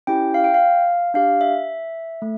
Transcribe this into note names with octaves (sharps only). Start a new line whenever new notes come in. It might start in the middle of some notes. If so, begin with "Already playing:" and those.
C#4 E4 G4 G5
F5
G5
F5
D4 G4 F5
E5
A3